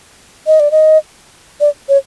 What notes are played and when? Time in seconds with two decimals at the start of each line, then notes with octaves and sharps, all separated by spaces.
0.47 D#5
0.60 D5
0.71 D#5
1.60 D5
1.89 C#5